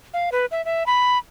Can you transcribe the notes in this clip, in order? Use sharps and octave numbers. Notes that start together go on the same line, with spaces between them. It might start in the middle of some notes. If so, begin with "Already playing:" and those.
F5
B4
E5
E5
B5